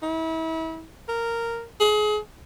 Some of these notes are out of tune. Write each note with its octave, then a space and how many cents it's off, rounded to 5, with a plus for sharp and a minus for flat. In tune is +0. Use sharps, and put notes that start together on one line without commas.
E4 -35
A#4 -10
G#4 +30